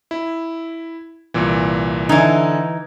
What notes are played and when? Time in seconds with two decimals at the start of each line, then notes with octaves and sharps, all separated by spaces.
0.11 E4
1.34 C2 A#2 E3
2.09 D3 E3 D#4 G#5 G#6